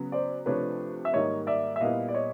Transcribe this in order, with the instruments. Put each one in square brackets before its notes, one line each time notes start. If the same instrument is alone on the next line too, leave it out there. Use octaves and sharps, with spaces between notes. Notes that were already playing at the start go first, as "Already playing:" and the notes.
Already playing: [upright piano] C#3 F#3 B3
[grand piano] C5 D5
[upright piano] C3 F3 A3 D4 [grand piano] B4 C#5
[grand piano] E5
[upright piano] G#2 D#3 G3 A#3 [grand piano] C#5 D#5
[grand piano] D5 E5
E5
[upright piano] A#2 G3 B3 E4 [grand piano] D#5 F5
[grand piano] D5
C#5 D#5